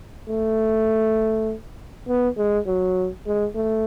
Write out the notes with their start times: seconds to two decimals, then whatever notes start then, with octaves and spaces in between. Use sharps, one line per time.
0.30 A3
2.08 B3
2.38 G#3
2.67 F#3
3.27 G#3
3.56 A3